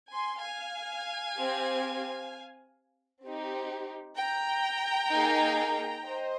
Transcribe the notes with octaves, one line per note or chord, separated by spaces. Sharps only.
G#5 C6
F5 G#5
C4 G4
C4 D#4 G4
G5 A#5
A#3 D#4 G#4
C5 D#5